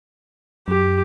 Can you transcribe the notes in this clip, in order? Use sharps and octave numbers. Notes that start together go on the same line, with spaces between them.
F#2 G4